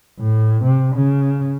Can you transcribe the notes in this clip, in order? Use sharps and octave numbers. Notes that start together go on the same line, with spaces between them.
A2
C3
C#3